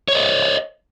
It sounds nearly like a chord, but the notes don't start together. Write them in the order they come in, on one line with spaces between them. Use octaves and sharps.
C#5 C5 D#5